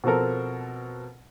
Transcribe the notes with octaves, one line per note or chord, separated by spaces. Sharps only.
B2 F3 C4 A4 A#4